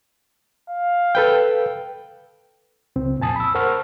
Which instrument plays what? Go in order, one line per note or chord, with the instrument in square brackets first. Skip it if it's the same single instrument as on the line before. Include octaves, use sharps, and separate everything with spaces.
[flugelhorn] F5
[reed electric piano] A4 B4 G5
C#2 C4
F2 A#2 G#5 A5 D#6
B5 E6
A#4 C5 F#5 A5 C#6 F6